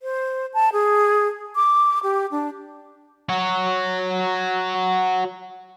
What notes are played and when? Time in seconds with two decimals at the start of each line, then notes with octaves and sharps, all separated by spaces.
0.02 C5
0.54 A5
0.73 G#4
1.56 D6
2.03 G4
2.31 D4
3.29 F#4 C#5